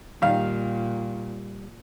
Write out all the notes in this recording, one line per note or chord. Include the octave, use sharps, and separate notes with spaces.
A#2 D#3 G3 F5